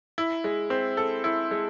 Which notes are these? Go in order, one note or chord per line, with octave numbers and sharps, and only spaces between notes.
E4
G#3
C4
A4
E4
G#3